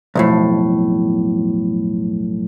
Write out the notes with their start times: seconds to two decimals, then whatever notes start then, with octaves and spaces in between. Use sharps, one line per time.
0.15 B1 F2 A2